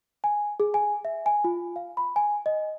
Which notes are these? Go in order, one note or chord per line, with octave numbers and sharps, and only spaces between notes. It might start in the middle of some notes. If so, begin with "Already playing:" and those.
G#5
G#4
G#5
E5
G#5
F4
F5
B5
G#5
D#5